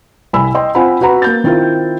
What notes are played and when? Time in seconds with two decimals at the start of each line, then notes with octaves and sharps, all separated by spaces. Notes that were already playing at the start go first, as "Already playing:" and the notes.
0.33 C2 G#5 B5 E6
0.55 D#5 G5 C6
0.75 C4 F4 C5 F#5 G#5 B5
1.01 F#4 B4 F#5 A#5 B5
1.22 A#3 G6 A6
1.44 D#3 C4 E4 F4 A#4